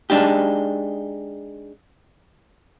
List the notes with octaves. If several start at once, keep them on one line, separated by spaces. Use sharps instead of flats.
G#3 D4 D#4 G4